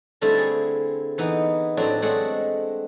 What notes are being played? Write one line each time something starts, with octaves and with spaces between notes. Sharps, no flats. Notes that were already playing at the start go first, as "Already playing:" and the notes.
D3 G3 A3 C4 E4
G#4
E3 B3 D#4
A2 F#3 C4 D4
G#3 A3 C4 D4 D#5 F#5